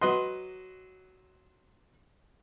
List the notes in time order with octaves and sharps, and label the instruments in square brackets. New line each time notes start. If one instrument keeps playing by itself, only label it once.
[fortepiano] F#3 B4 D#5 C6